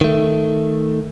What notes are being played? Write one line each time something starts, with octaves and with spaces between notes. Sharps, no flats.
D#3 A3